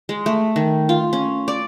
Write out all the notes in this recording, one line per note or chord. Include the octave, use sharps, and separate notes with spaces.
G#3
A3
D#3
F4
C#4
D5